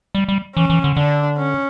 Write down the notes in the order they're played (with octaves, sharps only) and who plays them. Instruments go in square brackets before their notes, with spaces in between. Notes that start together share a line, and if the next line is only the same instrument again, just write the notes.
[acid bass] G3
G3
[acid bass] E3 [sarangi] C#4
[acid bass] E3
D3
[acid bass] D3 [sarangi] D4
[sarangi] C#4